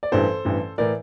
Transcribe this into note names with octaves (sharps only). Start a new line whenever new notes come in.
D5
A1 G2 E3 A4 C5
A1 G2 E3
A2 E3 A#4 D5